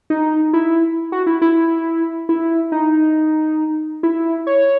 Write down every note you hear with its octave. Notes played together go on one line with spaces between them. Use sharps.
D#4
E4
F#4
E4
E4
E4
D#4
E4
C#5